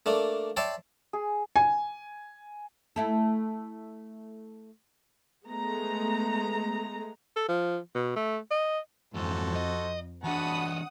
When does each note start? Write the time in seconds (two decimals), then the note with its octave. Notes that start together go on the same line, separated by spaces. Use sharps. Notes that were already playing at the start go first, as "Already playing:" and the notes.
0.06 A3 A#3 D4
0.57 C#5 D5 E5 G5 A5 C6
1.13 G#4
1.56 G#5
2.96 A3 E4 A4
5.46 G#3 A3 B3 A#5
7.36 A4
7.48 F3
7.95 B2
8.16 A3
8.51 D#5
9.14 F2 G#2 E3 F#4 A4 C5
9.56 D#5
10.24 E3 D4 F#4 F#5 A5 B5 D#6